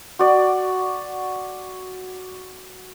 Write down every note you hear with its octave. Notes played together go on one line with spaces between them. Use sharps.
F#4 D5